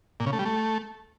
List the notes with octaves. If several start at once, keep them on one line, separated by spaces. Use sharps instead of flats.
A#2
C#3
A3
G3
A3